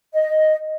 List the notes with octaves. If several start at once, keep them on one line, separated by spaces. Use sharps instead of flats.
D#5